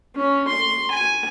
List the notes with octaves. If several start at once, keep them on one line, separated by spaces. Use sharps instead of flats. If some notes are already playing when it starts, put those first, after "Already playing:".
C#4
C6
G#5